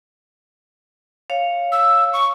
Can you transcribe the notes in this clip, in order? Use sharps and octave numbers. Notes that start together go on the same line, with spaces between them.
C#5 F5
E6
C#6